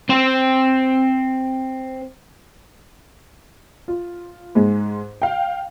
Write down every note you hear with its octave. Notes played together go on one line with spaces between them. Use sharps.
C4 C5
F4
G#2 G#3
F5 G5